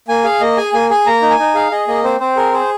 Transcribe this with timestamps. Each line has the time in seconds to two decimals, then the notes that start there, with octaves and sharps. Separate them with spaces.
0.08 A#3 G#5
0.24 G#4 F5
0.41 A#3 D#5
0.57 G#4 G#5
0.73 A#3 G#5
0.90 G#4 G#5
1.06 A#3 A#5
1.22 D#4
1.30 G#5
1.39 D#4
1.55 G#4 F5
1.72 G#4 D#5
1.87 A#3 D#5
2.04 C4 C5
2.20 C4 C5
2.36 G#4 A#4
2.53 G#4 C5